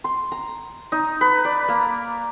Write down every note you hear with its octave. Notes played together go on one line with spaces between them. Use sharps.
C6
A#5
D#4
B4
D5
A#3